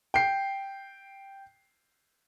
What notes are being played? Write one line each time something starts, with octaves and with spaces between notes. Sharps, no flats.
G5 C7